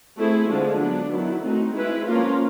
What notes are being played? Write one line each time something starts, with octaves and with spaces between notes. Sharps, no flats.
A3 C4 E4 G#4
D3 F3 G#3
F#3 B3 D4
D#3 F#3 B3 E4
A3 C4 D#4 F#4
G#3 C4 E4 G#4 B4
F3 A#3 C#4 F4 A#4